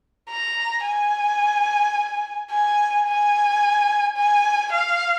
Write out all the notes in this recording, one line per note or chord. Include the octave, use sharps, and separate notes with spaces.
A#5
G#5
G#5
G#5
G#5
F5